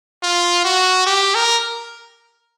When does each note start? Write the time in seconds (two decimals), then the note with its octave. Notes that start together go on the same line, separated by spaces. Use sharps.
0.23 F4
0.64 F#4
1.06 G4
1.35 A#4